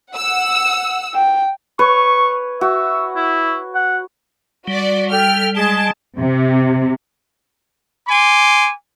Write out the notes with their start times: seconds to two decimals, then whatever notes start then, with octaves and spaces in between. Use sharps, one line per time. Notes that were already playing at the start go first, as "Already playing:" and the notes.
0.11 F#5 E6
1.14 G5
1.79 B4 C#5 C#6
2.61 F#4 E5
3.16 E4
3.75 F#5
4.67 G3 F#4 D5
5.12 A4 G5 F6
5.56 G#3 G#4 A5
6.19 C3
8.08 G#5 C6 D6